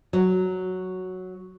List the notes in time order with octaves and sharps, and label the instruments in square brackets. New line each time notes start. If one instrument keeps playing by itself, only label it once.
[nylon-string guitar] F#3